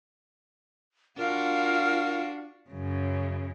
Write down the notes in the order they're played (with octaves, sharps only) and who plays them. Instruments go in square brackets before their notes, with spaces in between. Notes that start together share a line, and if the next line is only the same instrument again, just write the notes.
[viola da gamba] D4 F#4 [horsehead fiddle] F4 F5 [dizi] A#4
[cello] F#2 C#3